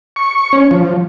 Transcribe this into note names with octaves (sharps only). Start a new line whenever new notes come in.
C#6
C#4
F3